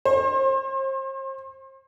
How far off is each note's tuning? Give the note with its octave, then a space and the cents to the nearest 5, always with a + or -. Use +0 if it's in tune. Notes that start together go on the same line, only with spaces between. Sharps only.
C5 +35